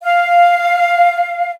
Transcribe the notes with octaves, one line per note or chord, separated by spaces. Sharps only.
F5